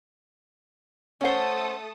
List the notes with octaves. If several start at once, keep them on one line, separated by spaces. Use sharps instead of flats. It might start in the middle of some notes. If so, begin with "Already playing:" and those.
A3 C#4 A4 C5 C#5 F#5 D#6